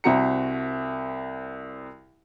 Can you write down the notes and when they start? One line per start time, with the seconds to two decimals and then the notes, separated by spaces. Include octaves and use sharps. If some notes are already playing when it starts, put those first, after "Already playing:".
0.04 C2 C4 F#4 A#5 C#7